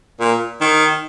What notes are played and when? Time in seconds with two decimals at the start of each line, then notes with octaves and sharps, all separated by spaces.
0.20 A#2
0.60 D#3